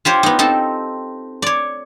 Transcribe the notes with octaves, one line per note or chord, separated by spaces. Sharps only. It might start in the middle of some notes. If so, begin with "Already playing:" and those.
F4 G4 C5 C#5
B3 D#4
C4 D#4 A4 A5
C#5 D5